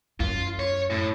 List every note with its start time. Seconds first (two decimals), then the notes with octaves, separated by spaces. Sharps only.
0.20 F#2 F4
0.60 C#5
0.90 A2